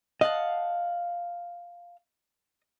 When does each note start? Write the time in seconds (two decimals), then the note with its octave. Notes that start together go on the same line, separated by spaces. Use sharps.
0.21 D#5 F5 F#5 A5